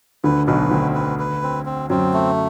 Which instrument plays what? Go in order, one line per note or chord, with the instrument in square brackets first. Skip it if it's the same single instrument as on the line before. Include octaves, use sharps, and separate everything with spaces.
[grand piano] D2 D3 [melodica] B4
[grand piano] B1 B2 [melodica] B4
[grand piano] D2 D3 [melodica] C4
[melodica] B4
B4
C4
C4
[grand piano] F#2 F#3 [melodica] C4
[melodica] A3